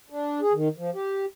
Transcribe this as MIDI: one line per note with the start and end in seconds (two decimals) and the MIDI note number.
0.10 0.40 62
0.41 0.53 68
0.53 0.68 51
0.78 0.90 53
0.94 1.25 67